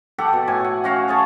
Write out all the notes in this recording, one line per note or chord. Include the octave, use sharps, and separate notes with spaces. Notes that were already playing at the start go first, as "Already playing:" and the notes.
G4 A4 F#5 D6
B2
A2 G#5
F#5
C#4 F#4 F5 F#5
G#4 C#5 A5